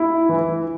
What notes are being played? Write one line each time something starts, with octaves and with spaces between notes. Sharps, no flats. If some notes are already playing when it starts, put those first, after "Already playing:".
Already playing: E4
E3